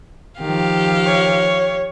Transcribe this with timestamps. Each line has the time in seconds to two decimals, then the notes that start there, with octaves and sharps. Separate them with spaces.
0.41 D#3 F3 G4 F5
1.06 C#5